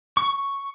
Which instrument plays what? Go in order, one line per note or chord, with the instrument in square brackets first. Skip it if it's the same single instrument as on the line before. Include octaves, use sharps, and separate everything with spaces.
[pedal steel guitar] C#6